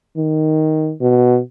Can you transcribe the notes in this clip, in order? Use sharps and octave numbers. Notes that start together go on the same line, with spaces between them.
D#3
B2